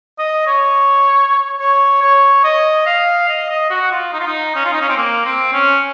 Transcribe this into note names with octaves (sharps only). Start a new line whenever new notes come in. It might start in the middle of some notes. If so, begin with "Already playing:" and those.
D#5
C#5
C#5
C#5
D#5
F5
D#5
D#5
F#4
F4
D#4
F4
D#4
C#4
F4
D#4
C#4
C4
A#3
C4
C#4